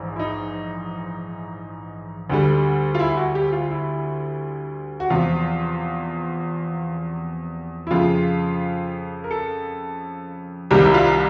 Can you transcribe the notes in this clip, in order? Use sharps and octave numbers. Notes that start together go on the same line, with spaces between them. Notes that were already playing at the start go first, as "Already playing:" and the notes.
Already playing: A#1 G#2 E3
E4
D#4
D2 D3 G3
F4
E4
F#4
G4
F4
E4
F#4
E2 C3 F3 F4
E4
F2 C#3 F3 F4
A#4
A4
C2 C3 D#3 G3 A#3 G4
E4
F4